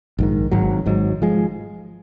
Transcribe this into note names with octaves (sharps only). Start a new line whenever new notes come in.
A#1 G#2 D#3
G#1 G#2 F#3
G#1 G#2 F#3
F3 G#3